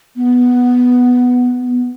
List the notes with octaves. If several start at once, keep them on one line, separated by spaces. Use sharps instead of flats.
B3
B3